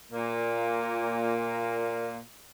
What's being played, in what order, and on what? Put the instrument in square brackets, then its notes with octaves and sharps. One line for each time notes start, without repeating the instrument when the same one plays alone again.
[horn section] A#2 A#3